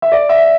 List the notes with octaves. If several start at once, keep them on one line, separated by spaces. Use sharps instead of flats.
E5
D5
E5